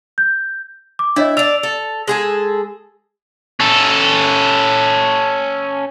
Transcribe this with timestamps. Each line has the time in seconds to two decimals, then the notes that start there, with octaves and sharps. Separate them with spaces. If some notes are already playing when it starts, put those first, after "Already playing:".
0.18 G6
0.99 D6
1.16 D4 E4 C#5 D#5
1.37 D4 D5 E6 F7
1.63 A4
2.08 G#3 G#4 A4
3.60 C#4 A4